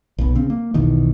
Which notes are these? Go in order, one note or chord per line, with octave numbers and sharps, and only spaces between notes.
B1 B2
C#3 C4 C#4
A#3
B1 E2 B2 D#3